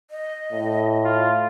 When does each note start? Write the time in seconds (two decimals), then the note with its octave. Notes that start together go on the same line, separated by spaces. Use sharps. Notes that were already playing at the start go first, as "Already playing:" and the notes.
0.11 D#5
0.53 A2
1.04 F4